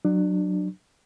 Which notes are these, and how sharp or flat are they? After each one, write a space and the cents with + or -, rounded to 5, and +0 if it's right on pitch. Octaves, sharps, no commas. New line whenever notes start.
F#3 +0 D4 +25